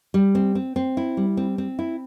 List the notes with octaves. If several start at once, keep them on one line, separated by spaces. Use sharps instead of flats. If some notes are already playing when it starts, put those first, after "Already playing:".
G3
C4
C4
C4
E4
G3
C4
C4
E4